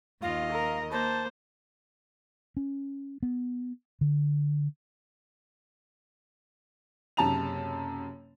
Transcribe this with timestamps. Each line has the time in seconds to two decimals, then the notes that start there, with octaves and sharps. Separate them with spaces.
0.22 D#2 F4 D#5 F5
0.51 A#4
0.92 A#3 C5 A5
2.57 C#4
3.23 B3
4.01 D3
7.17 F#1 F#2 C3 A5 A#5 F7